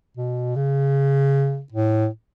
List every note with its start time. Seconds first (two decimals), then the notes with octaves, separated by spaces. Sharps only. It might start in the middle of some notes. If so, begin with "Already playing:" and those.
0.17 B2
0.56 C#3
1.72 A2